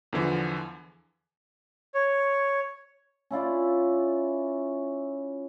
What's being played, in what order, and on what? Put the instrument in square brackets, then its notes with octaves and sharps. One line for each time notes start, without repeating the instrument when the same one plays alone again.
[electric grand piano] E2 D3 E3 F3
[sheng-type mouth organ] C#5
[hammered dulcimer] C#4 E4 F4 D5